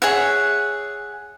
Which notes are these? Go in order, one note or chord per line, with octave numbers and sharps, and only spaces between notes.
G#4 C#5 E5 F#5